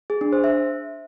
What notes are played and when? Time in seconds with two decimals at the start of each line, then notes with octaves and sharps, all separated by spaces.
0.10 G#4
0.21 D4
0.32 C5
0.44 E5